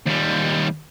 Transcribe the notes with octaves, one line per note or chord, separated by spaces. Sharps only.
D#2 G3